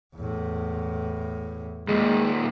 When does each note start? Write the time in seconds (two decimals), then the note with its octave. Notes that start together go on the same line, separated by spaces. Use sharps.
0.16 E2 A2
1.88 D#2 A#2 G#3